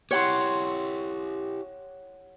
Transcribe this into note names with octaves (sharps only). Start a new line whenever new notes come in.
E4 G4 C#5 F#5 C6